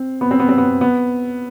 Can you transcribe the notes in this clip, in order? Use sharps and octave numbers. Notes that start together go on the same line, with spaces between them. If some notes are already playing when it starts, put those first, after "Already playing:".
Already playing: C4
B3
C4
B3
C4
B3
B3